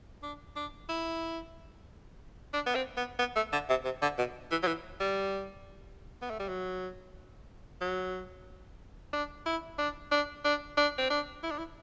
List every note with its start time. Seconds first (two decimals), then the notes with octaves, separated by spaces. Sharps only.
0.22 D4
0.56 D4
0.89 E4
2.53 D4
2.66 B3
2.75 C4
2.97 B3
3.19 B3
3.36 A3
3.52 D3
3.69 C3
3.85 C3
4.02 D3
4.18 B2
4.51 E3
4.62 F#3
4.67 E3
5.00 G3
6.22 B3
6.30 A3
6.39 G3
6.49 F#3
7.81 F#3
9.13 D4
9.46 E4
9.78 D4
10.11 D4
10.44 D4
10.77 D4
10.98 C4
11.10 D4
11.43 E4
11.51 D4
11.58 E4